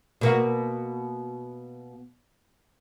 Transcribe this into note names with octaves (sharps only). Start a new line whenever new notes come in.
B2 A#3 F#4